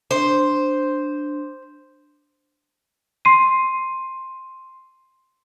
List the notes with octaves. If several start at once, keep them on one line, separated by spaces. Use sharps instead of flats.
D4 C5
C6 C7 D#7